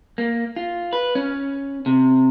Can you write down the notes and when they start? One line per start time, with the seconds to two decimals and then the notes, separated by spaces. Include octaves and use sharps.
0.18 A#3
0.56 F4
0.93 B4
1.15 C#4
1.86 C3